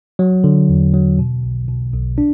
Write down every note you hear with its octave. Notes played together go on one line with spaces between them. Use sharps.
F#3
D3
E2
F#3
B2
B1
B2
B1
D4